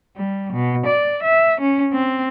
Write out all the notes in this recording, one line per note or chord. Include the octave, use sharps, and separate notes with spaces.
G3
B2
D5
E5
C#4
C4